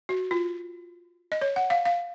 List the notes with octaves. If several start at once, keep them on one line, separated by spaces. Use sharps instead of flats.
F#4
F4
D#5
C#5
F#5
F5
F5